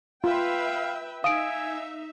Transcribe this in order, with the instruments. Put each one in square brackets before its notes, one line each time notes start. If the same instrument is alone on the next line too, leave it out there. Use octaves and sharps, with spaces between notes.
[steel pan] F4 [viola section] B4 E5 G5 [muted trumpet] F5
[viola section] D#4 E5 [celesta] F5 D7 [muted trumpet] G#5 [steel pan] D#6